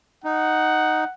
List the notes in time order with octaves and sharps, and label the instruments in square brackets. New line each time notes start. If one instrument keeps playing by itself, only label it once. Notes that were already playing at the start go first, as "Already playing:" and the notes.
[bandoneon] D#4 [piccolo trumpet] F#5